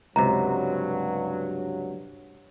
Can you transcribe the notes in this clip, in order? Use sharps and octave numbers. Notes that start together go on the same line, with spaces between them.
C#2 G2 C3 F#3 A#5